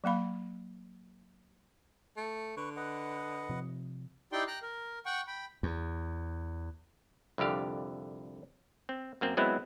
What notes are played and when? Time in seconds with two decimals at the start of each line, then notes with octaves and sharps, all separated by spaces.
0.04 F#3 A#3 F5 B5
2.17 A3
2.57 D3 B4 C#6
2.76 B4 D#5 F#5
3.50 C3 F3
4.32 D#4 E4 G4 D5 G5 C6
4.47 G5 A#5 F#6
4.62 A#4
5.06 F#5 G5 C#6
5.27 G5 B5
5.63 E2
7.38 C2 F2 D3 G4 F5
8.89 C4
9.21 F#2 A#3 C4
9.37 F#3 G#3 B3 C4 E4